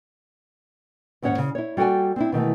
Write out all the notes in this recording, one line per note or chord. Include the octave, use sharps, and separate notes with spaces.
D#2 G#2 C#4 C#5 F#5
C#3
E4 C#5
G3 F#4 A4 G5 G#5
C4 D4 E4
B2 D#3 E3 A3